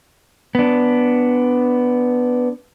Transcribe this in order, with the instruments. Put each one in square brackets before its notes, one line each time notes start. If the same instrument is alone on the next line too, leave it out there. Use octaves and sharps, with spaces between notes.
[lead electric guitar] B3 D4